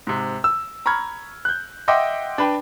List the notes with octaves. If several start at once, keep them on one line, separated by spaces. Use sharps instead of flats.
G#2 C3
E6
A#5 B5 C#6 F6 G#6
F#6 G6
D#5 E5 F#5 G5 C6 D6
D4 B4 G5